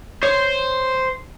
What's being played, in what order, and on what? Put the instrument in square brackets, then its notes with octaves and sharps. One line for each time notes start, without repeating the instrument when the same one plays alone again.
[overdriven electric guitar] C5 [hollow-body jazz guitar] C#5